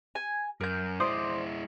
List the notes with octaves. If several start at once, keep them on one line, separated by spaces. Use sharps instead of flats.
G#5
F#2 A#4 G6
G#3 E4 C5 D5 D#6